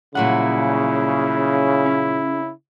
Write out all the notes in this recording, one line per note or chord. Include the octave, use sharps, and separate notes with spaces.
A#2 C#3 F#3 G3 E4 F#5
C#4